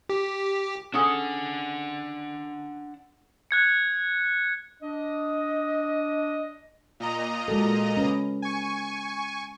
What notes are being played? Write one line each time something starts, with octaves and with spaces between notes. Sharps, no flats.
G4
C#4 D4 G#4 A4 F#5
F#6 G#6 C#7
D4 D#5
A#2 D#5 A#5
G#3 F#4 A4
C#4 B4
G#5 C#6